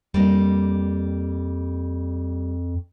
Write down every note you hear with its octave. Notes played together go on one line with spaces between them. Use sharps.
F2 G3 A#3 D#4